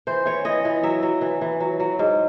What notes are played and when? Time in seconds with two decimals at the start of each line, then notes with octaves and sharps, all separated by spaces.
0.07 E3 C5
0.25 E3 C#5
0.45 E3 D#5
0.65 E3
0.83 F#3 E5
1.03 F#3
1.21 E3
1.41 E3
1.60 F#3
1.80 F#3
1.99 G#2